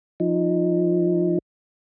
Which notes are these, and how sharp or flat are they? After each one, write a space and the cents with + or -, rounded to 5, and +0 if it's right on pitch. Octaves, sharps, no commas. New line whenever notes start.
F3 +0 D#4 -5